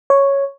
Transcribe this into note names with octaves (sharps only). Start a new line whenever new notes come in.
C#5